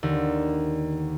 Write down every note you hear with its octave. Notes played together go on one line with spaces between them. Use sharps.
D#2 D3